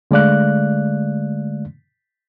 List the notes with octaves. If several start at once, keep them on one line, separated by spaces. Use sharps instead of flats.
D3 G#3 A3 D5 F5 F#6